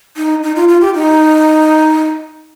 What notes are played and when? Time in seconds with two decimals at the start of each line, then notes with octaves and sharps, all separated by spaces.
0.17 D#4
0.43 D#4
0.56 F4
0.68 F4
0.81 G4
0.95 D#4